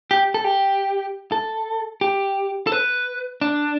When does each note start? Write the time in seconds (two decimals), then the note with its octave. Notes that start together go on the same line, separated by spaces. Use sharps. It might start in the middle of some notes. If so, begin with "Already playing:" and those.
0.11 G4
0.34 A4
0.44 G4
1.32 A4
2.01 G4
2.67 A4
2.72 B4
3.41 D4